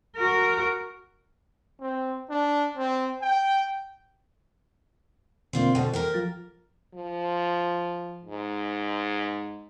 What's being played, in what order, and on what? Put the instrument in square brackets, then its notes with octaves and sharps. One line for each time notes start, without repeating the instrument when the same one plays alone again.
[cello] F#4 A#4
[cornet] C4
D4
C4
G5
[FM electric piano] B2 D3 A#3 [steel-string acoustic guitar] C4 F4 D5
[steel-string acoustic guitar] B2 D3 [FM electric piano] C5 G5
[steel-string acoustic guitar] A#3 G4 A#4
[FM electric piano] F3 F4 A6
[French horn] F3
G#2